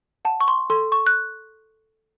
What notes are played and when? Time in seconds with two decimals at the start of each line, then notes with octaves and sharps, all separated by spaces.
0.25 F#5 A5
0.41 C#6
0.48 C6
0.70 A4 C6
0.92 C#6
1.07 F#6